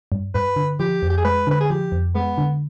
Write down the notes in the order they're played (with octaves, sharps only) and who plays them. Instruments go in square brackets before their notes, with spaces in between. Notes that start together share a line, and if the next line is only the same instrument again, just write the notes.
[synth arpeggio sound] G2
[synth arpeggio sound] G2 [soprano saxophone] B4
[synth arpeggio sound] D3
[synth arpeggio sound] F3 [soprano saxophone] G4
[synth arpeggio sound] F2
[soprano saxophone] G4
G#4
[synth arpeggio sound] G#3 [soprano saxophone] B4
[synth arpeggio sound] D3 [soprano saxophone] B4
[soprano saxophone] G#4
[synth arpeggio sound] F3 [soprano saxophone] G4
[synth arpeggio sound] F2
[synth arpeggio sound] G#3 [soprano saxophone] B3
[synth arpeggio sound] D3